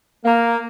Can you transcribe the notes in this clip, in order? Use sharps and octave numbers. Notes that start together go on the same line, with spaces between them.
A#3